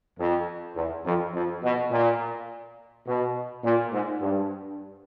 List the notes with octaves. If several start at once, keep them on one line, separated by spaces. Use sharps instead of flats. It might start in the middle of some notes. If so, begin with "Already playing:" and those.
F2
E2
F2
F2
B2
A#2
B2
A#2
G#2
G2